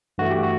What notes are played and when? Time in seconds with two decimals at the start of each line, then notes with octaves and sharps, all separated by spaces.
0.18 G2 E3 A3 F#4
0.31 G4
0.43 F#4